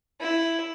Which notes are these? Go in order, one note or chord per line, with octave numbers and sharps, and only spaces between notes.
E4